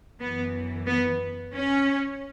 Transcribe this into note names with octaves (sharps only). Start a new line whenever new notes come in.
F#2 E3 B3
B3
C#4